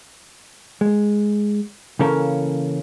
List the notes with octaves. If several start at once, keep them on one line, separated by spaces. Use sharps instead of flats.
G#3
C#3 E3 A#3 C#4 A4 A#4